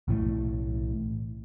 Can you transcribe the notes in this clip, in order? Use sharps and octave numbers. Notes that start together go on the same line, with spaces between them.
B1 A2 E3 A3